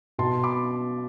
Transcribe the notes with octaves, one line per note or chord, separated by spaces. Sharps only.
B2 A5 C6
B5 D6